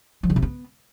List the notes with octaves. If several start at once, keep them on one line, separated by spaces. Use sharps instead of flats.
F3
D3
C3
B3